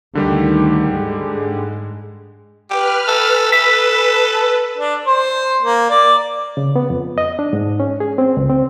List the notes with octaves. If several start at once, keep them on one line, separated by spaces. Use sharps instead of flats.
D2 D3 D#3 G3 G4
G#2 G#3
G4 B4 F6
A4
A4 B4 B6
D4
C5
A#3
D5
C#3
B3
F2
D#5
D4
G#2
C#4
G#4
C4
C#2
C4